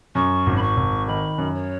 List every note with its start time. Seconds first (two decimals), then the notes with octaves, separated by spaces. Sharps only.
0.15 F#2 C#6
0.46 G#1
0.56 B5
0.62 C#6
0.77 G#1
1.07 D#3 B5
1.38 F#2
1.54 C#5